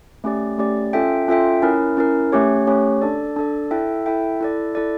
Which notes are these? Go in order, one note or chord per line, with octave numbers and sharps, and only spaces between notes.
A3 C#4 G4 D5
A3 C#4 G4 D5
C#4 F4 A4 E5 G5
C#4 F4 A4 E5 G5
C#4 E4 A#4
C#4 E4 A#4
A3 C#4 G4 C#5
A3 C#4 G4 C#5
D4 A4 D5
D4 A4 D5
E4 A4 E5 G5
E4 A4 E5 G5
E4 A4 D5
E4 A4 D5